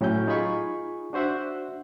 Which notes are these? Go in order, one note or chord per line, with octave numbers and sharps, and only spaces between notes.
A2 F#3 C#4 E4 G6
D#4 F4 G#4 G#5 B5 C#6
D4 F#4 C5 E5 F#5